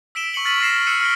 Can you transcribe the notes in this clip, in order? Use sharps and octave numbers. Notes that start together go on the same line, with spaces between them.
E6 B6 D7 E7 G7
C#6 B6 C#7 F#7 G7
C#6 F6 A6 B6 D#7 F#7
C#6 F6 A#6 C7 E7
E6 F#6 C#7 D#7 E7
F6 A#6 D7 G7